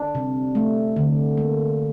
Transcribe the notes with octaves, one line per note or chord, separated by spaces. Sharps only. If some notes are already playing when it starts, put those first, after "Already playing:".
Already playing: D4
C3
A3
D3
A#3